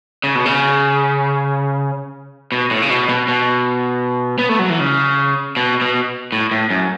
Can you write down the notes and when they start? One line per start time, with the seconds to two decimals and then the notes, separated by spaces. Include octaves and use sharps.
0.24 C#3
0.35 B2
0.46 C#3
2.52 B2
2.71 A2
2.82 C#3
2.90 B2
3.09 B2
3.28 B2
4.39 B3
4.49 A3
4.59 F#3
4.70 E3
4.80 C#3
5.57 B2
5.82 B2
6.32 A2
6.51 A2
6.70 F#2